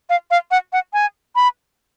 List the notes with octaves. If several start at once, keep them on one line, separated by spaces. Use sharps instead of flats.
F5
F5
F#5
F#5
G#5
B5